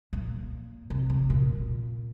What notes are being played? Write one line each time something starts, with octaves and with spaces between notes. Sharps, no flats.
A#2
C3
C3
A#2